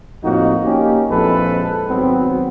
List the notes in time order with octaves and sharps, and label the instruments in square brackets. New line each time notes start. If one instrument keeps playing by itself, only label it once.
[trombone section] F2 A2 A#3 D#4 F#4
A#3 C#4 D#4 G4
A#1 F2 G#3 E4 A4 B4
G#1 F#3 B3 C4